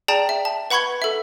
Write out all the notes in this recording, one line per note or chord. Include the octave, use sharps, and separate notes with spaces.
G#4 D5 G5 A5 A#5 E7
E5
A5
B4 F#5 B5 C#6 G#6 G7
A4 E5